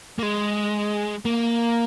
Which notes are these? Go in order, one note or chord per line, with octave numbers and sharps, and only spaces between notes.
A#3
G#3
A#3